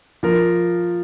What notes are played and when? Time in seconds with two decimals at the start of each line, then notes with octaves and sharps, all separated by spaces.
0.23 F3 A#4